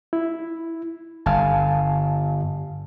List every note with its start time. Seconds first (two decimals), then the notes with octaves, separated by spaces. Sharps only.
0.13 E4
1.26 G1 F5 G#5 A5